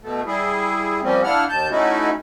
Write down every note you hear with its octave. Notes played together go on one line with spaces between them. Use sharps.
B2 A3
G3 E4 G#4
F3 G3 A#3 C4 C#4
A#3 D4 E4 F#5 F6
D#2 A5 G6
A3 C#4 D#4 E4 F#4